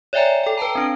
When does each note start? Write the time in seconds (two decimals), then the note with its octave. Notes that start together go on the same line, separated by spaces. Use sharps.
0.13 C#5 D5 E5 G5 G#5 A#5
0.43 A4 G5
0.57 B4 G5 A5 A#5
0.75 C4 D4 D7